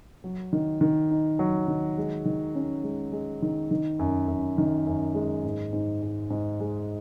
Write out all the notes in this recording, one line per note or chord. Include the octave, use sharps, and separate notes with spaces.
F#3
D#3
D#3
D#4
F#3
D#3
G#3
D#3
C#4
G#3
G#3
D#3
D#3
F#2
F#2
D#3
F#2
G#3
G#2
G#2
G#2
G#2
G#3